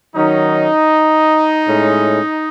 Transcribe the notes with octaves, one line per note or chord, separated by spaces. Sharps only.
D#3 F#3 C#4 D#4
A2 G#3 C#4